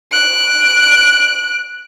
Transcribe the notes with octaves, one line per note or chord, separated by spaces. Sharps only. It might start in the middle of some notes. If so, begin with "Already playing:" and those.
F#6 D7